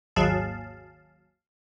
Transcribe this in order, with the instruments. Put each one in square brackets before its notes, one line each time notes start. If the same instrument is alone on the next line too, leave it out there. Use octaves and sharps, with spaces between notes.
[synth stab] G#1 D#2 F#3 G#4 F5 A5